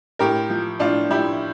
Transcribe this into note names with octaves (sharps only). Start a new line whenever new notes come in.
A2 G4 A#4
F3
A2 D4 F4
F3 E4 G4